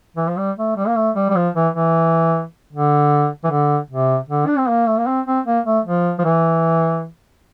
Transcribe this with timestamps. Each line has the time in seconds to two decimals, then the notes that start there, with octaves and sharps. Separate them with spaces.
0.17 E3
0.28 F3
0.38 G3
0.58 A3
0.77 G3
0.87 A#3
0.97 A3
1.16 G3
1.30 G3
1.36 F3
1.55 E3
1.74 E3
2.73 D3
3.44 E3
3.51 D3
3.90 C3
4.29 D3
4.47 D4
4.57 C4
4.69 A#3
4.88 A3
4.98 A#3
5.07 C4
5.27 C4
5.46 A#3
5.66 A3
5.85 F3
6.19 F3
6.25 E3